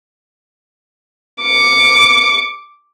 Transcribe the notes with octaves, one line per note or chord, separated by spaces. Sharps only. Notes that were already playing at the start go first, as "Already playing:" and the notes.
D6 C#7